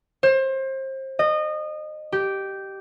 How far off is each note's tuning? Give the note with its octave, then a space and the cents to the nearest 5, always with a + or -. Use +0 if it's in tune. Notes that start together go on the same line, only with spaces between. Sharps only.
C5 +30
D#5 -25
G4 -10